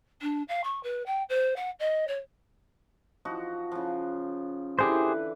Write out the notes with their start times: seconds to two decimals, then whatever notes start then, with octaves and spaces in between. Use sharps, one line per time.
0.22 D4
0.48 F5
0.64 C#6
0.83 B4
1.06 G5
1.29 C5
1.56 F#5
1.79 D#5
2.08 C#5
3.25 F3 D#4 F#4
3.72 C#3 F3
4.79 D3 E3 G4 G#4 B4 C5